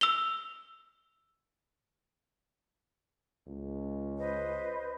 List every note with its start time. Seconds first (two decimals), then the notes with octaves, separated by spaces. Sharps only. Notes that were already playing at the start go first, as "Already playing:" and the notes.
0.01 E6 F7 G7
3.47 C#2
4.19 B4 C5 D#5